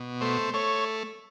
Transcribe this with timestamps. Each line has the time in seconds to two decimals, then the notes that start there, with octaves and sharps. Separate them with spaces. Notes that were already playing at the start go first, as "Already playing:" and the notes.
Already playing: B2
0.21 A3 C5
0.54 A3 C#5